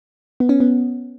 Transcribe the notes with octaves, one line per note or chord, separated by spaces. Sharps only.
B3
C#4
B3